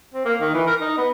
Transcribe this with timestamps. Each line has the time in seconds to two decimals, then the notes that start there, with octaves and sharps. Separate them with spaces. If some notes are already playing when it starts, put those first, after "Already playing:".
0.14 C4
0.25 A#3
0.41 D#3
0.54 E3
0.67 A#4
0.81 D#4
0.98 B3